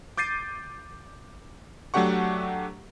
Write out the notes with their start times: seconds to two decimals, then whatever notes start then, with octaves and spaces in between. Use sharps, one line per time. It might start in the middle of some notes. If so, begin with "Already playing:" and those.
0.17 D6 G6 A6 C7 D#7
1.94 F#3 A3 D4 G4 F#5 C#6